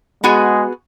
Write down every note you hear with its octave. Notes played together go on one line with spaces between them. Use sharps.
G#3 B3 F#4 G#4